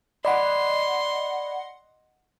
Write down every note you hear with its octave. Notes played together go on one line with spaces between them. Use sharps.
D5 D#5 F#5 B5 C6